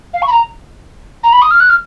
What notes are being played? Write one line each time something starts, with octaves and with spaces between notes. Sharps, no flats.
F5
C#6
B5
A#5
A#5
B5
D#6
F6
F#6
F6